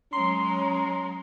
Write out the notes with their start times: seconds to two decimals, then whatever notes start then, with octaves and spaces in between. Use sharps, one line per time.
0.13 F#3 G#3 C#4 A#5 C6